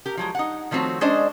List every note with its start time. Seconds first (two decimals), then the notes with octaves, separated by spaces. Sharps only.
0.06 G4 A#4
0.17 F3 F#3 G#3
0.35 D#4 F#5
0.71 D#3 F3 A3 C4 F#4 C#5
1.01 G#3 C#4 D4 C5 D5 D#5